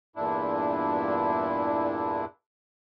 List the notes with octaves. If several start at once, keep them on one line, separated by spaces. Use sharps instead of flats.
E2 G2 A#2 D4 E4